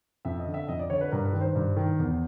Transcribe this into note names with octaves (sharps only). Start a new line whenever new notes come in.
F2 E5
D#5
D3
E5
F2 D#5
D5
D3 C#5
B4
G2 A#4
B4
D#3
C5
G2
D#3
E2